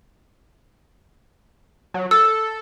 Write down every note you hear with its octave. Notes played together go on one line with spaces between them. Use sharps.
F#3
A4 E6